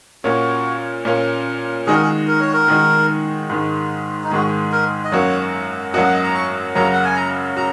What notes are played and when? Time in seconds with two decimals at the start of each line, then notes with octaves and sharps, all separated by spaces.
0.24 A#2 A#3 C#4 F#4
1.05 A#2 A#3 C#4
1.87 D#3 G#3 D#4 F#4 G#4
1.94 A#4
2.02 G#4
2.27 A#4
2.40 C#5
2.53 A#4
2.68 D#3 G#3 D#4 F#4
3.50 G#2 D#3 G#3
4.24 D#4
4.31 G#2 D#3 G#3 F#4
4.72 A#4
5.05 D#5
5.12 F#2 F#3 A#3 F#4 C#5
5.94 F#2 F#3 A#3 F#4 D#5
6.03 F#5
6.13 D#5
6.24 A#5
6.34 C#6
6.75 F#2 C#3 F#3 A#3 F#4 A#5
6.93 F#5
7.05 G#5
7.16 A#5
7.57 F#4 A#5